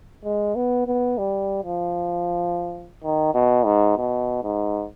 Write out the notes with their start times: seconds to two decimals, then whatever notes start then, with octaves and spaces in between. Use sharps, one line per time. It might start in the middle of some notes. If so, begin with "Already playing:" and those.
0.25 G#3
0.56 B3
0.87 B3
1.18 G3
1.64 F3
3.04 D#3
3.34 B2
3.65 G#2
3.97 B2
4.43 G#2